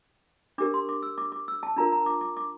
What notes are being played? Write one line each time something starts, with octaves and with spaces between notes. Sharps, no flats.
D4 G4 A#4 D6
C6
D6
E6
D6
D6
E6
A5
D4 F4 A#4 A#5
A#5
D6
D6
D6